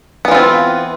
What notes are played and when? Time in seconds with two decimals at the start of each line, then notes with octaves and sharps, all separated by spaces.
0.25 B3
0.28 E3
0.31 F4
0.35 C4